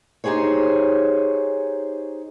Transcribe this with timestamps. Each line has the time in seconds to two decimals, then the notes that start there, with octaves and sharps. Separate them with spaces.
0.24 D#4 G4 G#4 C5 C#5